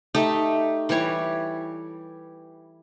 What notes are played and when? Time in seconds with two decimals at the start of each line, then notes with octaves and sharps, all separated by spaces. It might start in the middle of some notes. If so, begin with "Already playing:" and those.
0.15 A3 D#4 G4
0.89 E3 G3 G4 C#5